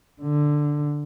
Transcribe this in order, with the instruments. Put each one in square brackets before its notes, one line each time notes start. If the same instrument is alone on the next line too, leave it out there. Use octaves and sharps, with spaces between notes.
[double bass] D3